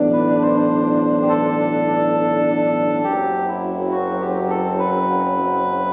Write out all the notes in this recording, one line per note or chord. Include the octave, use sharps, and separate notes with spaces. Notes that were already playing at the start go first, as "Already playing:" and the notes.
Already playing: B1 A2 E3 B3 D4
B4
C5
G4
A4
F#1 F#2 F#3 C4 G4
E4
F#4
G4
A4
B4